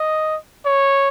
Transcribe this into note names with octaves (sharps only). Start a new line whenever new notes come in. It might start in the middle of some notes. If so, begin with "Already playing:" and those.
Already playing: D#5
C#5